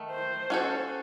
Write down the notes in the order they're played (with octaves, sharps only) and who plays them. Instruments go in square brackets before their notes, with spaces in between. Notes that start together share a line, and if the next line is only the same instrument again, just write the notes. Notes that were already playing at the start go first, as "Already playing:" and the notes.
Already playing: [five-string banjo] D#3 A3
[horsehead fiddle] C5
[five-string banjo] C#4 F#4 A4